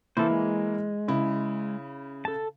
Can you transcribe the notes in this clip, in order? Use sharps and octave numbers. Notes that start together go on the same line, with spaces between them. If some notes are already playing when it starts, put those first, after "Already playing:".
E3 A#3 E4 A4 C5
G#3
C#3 E4
A4 A5